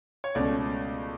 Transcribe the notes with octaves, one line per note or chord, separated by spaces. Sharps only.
C#5
C#2 B2 A3 C#4 D5